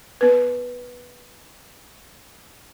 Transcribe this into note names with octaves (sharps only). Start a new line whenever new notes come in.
B3 B4